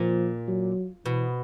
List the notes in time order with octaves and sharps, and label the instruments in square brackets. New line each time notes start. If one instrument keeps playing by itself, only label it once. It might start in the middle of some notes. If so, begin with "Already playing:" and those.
Already playing: [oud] A#2 [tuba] F3
[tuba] F#3
[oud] B2 [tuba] E3